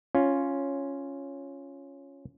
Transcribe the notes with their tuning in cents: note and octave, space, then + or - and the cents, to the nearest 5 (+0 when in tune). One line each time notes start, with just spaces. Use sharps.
C#4 +0 F4 +0